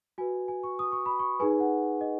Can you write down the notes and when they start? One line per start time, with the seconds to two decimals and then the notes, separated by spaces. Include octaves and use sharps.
0.18 F#4 B4 G#5
0.48 G#5
0.63 C#6
0.79 D#6
0.92 C#6
1.06 B5
1.19 C#6
1.40 D#4 G#4 B4 G#5
1.50 G#5
1.60 F#5
2.01 D#5